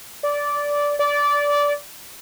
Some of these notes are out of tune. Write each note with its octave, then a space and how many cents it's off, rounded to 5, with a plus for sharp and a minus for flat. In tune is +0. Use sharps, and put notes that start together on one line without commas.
D5 -15
D5 -20